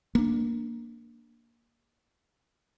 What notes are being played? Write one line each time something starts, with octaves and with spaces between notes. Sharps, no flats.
A#3 D4